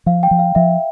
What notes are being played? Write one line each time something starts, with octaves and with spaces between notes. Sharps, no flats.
F3 F5
G5
F3
F5
F3 E5